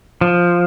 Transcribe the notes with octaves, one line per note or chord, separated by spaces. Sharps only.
F3